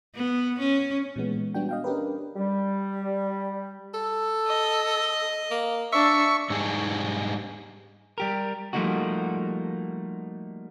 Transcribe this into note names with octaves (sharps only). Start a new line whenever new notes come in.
B3
C#4
A#2 E3 G#3 B3
G3 B3 D4 F#4 G5
D#5 F5 G5
C#4 D4 G4 A#4 B4
G3
A4
D#5
A#3
D4 E5 C#6
G#2 G3 D4 D#4 G4 G#4
G3 G4 A#4
F3 G3 A3 A#3 D#4 F#4